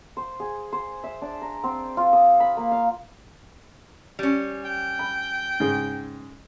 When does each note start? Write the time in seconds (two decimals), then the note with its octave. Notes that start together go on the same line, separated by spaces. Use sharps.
0.17 C5
0.40 G#4
0.73 C5
1.04 E5
1.22 D4
1.42 A#5
1.64 C4
1.97 F4
2.13 D#6
2.40 B5
2.57 A#3
2.72 F5
4.19 G3 C#4
4.65 G5
4.99 B5
5.60 G#2 C#3 G#4